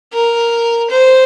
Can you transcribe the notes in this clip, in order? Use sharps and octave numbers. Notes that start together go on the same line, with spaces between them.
A#4
C5